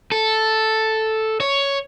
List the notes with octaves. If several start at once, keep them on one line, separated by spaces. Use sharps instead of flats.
A4
C#5